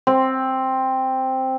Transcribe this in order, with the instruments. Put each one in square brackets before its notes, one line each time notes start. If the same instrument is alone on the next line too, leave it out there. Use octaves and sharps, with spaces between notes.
[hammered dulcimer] C4